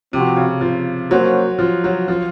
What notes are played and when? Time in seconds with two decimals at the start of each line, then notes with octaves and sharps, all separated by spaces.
0.13 C3 F3 C4 F#4
0.36 C#3
0.61 F3
1.11 F#3 A#3 C#4 F#4 C5
1.59 F3
1.84 F#3
2.08 F3